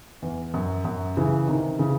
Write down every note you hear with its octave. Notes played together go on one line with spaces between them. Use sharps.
E2
F#2
F#2
C#3 E3
C3 D#3
C#3 E3